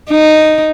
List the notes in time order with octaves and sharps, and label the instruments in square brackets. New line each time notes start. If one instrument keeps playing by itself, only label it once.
[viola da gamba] D#4